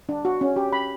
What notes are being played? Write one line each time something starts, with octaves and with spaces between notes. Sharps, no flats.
D4
F#4
C#4
G4
B5